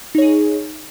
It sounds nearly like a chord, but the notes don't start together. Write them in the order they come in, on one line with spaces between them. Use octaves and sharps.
D#4 C#5 G#4